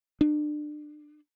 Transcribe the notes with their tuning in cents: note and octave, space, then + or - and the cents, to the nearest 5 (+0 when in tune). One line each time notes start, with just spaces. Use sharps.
D4 +30